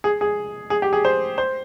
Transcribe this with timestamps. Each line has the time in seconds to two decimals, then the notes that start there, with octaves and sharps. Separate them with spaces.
0.04 G#4
0.21 G#4
0.70 G#4
0.82 G4
0.93 G#4
1.05 C5
1.38 C5